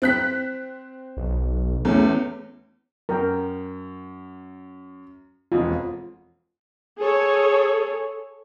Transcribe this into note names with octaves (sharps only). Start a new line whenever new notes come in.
C4 F#6 B6
B1
E2 A3 C#4
F#2 A#4 G5
E1 F2 F4
G#4 A4 C#5